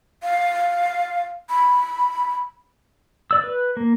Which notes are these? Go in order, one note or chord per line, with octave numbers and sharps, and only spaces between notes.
F5
B5
D5 E6
B4
A#3